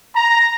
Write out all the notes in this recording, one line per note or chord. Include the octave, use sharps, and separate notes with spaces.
A#5